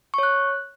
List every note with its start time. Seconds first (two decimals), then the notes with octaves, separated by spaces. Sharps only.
0.14 C#6
0.18 C#5
0.23 F#6